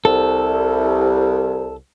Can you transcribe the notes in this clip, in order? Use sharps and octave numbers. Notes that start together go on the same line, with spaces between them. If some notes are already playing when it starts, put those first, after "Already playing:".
C2 A4